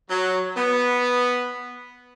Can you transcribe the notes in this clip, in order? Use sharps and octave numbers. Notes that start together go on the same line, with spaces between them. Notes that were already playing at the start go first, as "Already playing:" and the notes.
F#3
B3